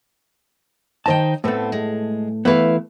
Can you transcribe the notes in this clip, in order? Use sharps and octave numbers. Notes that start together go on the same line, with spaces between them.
D#3 D#4 C5 G5 A5
A2 A3 B3 C4
G#3
E3 A3 B3 E4 B4 F5